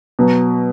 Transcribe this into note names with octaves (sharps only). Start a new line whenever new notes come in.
B2 F#3